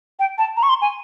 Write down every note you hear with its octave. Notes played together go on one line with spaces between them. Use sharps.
G5
A5
A#5
C#6
C6
G#5